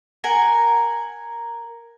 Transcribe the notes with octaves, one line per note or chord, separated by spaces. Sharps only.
A#4 F#5 G#5